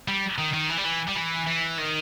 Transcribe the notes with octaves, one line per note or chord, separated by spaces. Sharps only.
G3
D#3
D#3
E3
G3
E3
G3
E3
E3
D#3